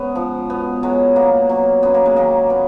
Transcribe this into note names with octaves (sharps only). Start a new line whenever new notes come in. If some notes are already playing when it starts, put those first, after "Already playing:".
Already playing: G#2 B3 C#4
F3
B2 B3
F#3 G#3
B2 A#3
F#3
F#2 B3
A#3
G#3
D#3 F#3 A#3
B3